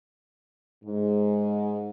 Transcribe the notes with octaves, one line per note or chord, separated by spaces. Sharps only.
G#2